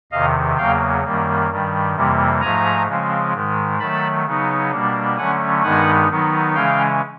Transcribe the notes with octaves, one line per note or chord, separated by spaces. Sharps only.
E2 C3 D#3 D#5 F5
E2 C#3 F#3 A#3 F5 G5
F#2 D#3 G3 A#3
G2 D#3 G3
F2 C3 E3 G3 A#3
G#2 F3 A3 G#5 A#5
C#3 F3 G#3 C4
G#2 D#3 G#3
D#3 F#3 A3 A5 B5
C#3 F#3 B3 D#4
B2 G3 A#3 D4
D3 F#3 A3 C#4 F#5 G#5
G2 D#3 G#3 B3 D#4 F#5 G#5
D#3 F#3 B3 D#4
C#3 E3 G#3 C#4 F5 G5